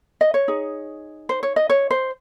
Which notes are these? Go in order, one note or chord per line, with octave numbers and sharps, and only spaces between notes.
D#5
C#5
D#4 G#4
C5
C#5
D#5
C#5
C5